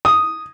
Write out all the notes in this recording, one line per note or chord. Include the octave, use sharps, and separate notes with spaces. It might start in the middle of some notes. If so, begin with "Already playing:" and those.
D#6